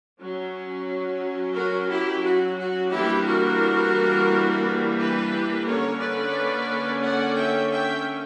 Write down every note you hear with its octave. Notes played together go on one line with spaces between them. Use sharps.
F#3 C#4
F#4 A#4
E4 G4
F#4
F#4
E3 G3 A#3 D4 E4 G4
F#4 A#4
G4 B4
D3 A#3 C#4 A#4 C#5
B4 D5
D5 F#5
E5 G5
E5 G5